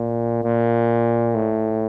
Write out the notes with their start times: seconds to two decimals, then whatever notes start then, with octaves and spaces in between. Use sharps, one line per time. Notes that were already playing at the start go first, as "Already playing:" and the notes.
Already playing: A#2
0.43 A#2
1.35 A2